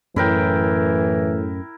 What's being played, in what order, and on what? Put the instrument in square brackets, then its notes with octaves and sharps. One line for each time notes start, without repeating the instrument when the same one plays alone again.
[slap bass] F#2 [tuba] A2 [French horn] E3 [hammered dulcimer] E4 A#4 G5